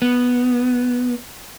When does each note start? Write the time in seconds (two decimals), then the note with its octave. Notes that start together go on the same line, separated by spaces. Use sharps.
0.02 B3